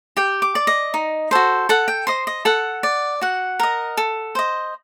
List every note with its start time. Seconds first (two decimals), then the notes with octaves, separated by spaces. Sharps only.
0.17 G4 G5
0.42 D6
0.55 D5
0.67 D#5
0.94 D#4
1.31 F#4 A4 C5
1.69 A4 F#5
1.88 G5
2.07 C5 D#5 C6
2.27 D#5
2.45 A4 F#5
2.83 D5
3.21 F#4 F#5
3.60 A#4 D#5
3.97 A4
4.35 C5 D#5